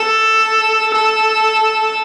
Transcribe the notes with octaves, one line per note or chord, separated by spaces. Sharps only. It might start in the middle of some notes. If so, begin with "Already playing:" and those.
Already playing: A4
A4